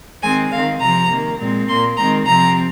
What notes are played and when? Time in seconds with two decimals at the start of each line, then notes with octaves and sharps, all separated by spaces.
0.22 D#3 G#3 C4 G#5
0.51 D#3 C4 F5
0.80 C3 F3 C4 A#5
1.09 D#3 A#3
1.39 A#2 G#3 C4
1.68 A#2 A#3 C6
1.96 D#3 G#3 C4 A#5
2.26 C3 F3 C4 A#5